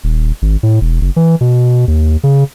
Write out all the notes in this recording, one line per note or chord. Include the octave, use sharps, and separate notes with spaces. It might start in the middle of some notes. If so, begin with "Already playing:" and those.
D#1
G#1
A2
E1
F#1
E3
B2
D#2
C#3